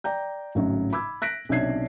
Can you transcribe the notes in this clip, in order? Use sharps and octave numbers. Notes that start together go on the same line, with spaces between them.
D5 G5 A#5 G6
G#1 A2 C#3 F#3
B5 D6 E6 G#6
F#6 A#6 B6 D7
B1 C3 C#4 D4 G#6 C7